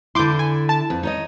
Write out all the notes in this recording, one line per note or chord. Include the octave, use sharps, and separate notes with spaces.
D3 E4 C6 D6 G6
G#5
A5
F2
D#4 C#5 D#5